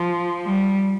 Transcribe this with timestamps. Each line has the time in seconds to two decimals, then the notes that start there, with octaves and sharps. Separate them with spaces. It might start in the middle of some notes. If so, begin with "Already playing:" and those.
Already playing: F3
0.45 G3